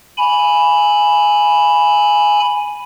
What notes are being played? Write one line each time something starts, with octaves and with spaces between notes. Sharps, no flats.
G#5 B5